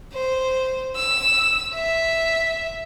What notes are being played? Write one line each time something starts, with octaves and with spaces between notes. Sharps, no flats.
C5
E6
E5